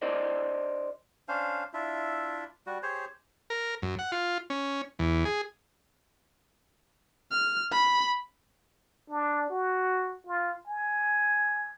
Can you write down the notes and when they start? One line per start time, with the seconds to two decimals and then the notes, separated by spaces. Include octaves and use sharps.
0.02 D4 G4 A#4 C5 D5 D#5
1.28 C#4 D4 C5 F5
1.74 D4 E4 F4 E5
2.66 G3 F#4
2.83 G4 G#4 C5 C#5
3.50 A#4
3.82 F#2
3.99 F#5
4.12 F4
4.50 C#4
4.99 E2
5.25 G#4
7.31 F6
7.72 B5
9.10 D4
9.50 F#4
10.27 F4
10.67 G#5